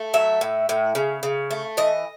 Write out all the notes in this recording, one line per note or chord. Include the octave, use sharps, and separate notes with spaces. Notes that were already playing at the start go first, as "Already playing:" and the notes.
Already playing: A3
F#3 E5
A2
A2
C#3
C#3
A3
E3 D#5